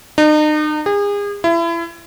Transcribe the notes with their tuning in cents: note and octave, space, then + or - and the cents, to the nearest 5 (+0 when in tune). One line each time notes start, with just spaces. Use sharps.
D#4 -40
G#4 -35
E4 +30